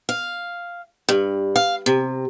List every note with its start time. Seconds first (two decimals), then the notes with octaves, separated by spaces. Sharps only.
0.09 F5
1.09 G2
1.56 F5
1.86 C3